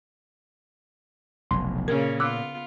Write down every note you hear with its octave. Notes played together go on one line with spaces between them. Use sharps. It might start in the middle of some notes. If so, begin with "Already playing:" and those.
F1 B1 C6
A#2 C#3 A#3 C#4 A#4
B3 F4 D6 E6 F#6